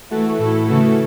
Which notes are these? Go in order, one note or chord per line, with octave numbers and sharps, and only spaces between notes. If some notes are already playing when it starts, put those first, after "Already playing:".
E3 A3 F#4 A4
A2 A3 E4 A4
C#3 E3 A3 F#4 A4